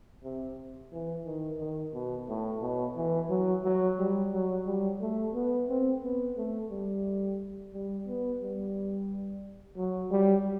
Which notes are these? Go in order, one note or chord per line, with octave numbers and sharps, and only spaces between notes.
C3
E3
D#3
D#3
B2
A2
B2
E3
F#3
F#3
G3
F#3
G3
A3
B3
C4
B3
A3
G3
G3
B3
G3
F#3
G3